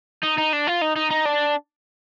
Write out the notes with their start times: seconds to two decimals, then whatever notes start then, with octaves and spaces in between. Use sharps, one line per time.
0.23 D#4
0.38 D#4
0.53 D4
0.67 F4
0.81 D#4
0.96 D#4
1.10 D#4
1.25 D4